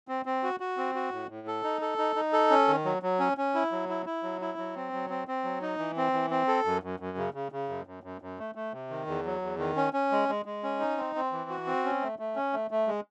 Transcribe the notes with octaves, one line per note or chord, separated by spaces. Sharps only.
C4
C4
F#4
F#4
C4
F#4
A2
A2
A4
D#4
A4
D#4
D#4
A4
C#4
D#3
F#3
F#3
C#4
C#4
E4
F#3
E4
E4
F#3
E4
F#3
C4
F#3
C4
C4
F#3
D#4
E3
C4
E3
C4
A4
F#2
F#2
F#2
C#3
C#3
C#3
F#2
F#2
F#2
F#2
A3
A3
C3
D#3
E2
F#3
E2
D#3
C#4
C#4
G#3
G#3
G#3
C#4
D#4
C4
C4
E3
F#4
C4
C#4
A3
A3
C#4
A3
A3
G#3